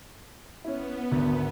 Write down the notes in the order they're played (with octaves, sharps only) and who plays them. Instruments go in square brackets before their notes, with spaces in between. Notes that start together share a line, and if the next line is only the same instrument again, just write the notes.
[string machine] B3 [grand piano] C#4 E4
[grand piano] G#1 D2 D3